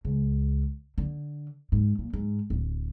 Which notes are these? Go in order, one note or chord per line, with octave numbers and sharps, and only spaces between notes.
C#2
D3
G#2
A#2
G#2
D1